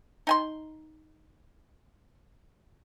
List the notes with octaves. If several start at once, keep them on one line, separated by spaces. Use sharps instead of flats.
D#4 G#5 C6